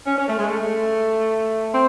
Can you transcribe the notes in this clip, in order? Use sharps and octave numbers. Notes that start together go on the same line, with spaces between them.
C#4
C#4
A3
G#3
A3
C4